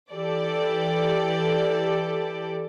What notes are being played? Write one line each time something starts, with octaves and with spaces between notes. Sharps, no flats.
E3 G4 A4 D5